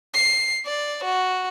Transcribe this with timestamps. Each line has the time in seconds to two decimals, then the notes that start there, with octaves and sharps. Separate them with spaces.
0.14 C7
0.66 D5
1.04 F#4